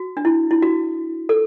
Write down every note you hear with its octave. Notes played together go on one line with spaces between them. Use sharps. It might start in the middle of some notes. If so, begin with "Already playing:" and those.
Already playing: F#4
D4
E4
E4
F#4
A4